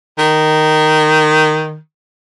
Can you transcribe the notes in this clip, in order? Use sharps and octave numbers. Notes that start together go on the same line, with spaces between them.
D#3